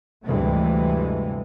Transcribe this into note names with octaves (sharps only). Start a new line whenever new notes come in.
D2 G2 C3 E3 G#3 A3